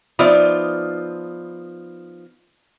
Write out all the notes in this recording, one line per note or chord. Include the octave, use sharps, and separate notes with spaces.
F3 B3 D#4 F4 D5 E5